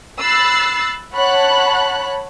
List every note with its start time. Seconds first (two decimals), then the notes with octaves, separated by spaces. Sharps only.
0.20 B5 E6 F#6 A6 C7
1.14 C#5 F#5 A5 B5 F#6